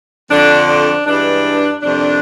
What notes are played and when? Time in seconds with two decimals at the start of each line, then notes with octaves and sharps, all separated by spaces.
0.31 F2 D3 F3 D4
0.69 D4
1.06 G2 E3 G#3 D4
1.82 F2 C3 D#3 D4